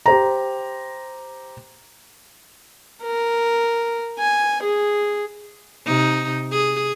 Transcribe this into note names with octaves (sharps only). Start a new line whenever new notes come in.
G4 C5 A#5
A#4
G#5
G#4
C3 D#4
G#4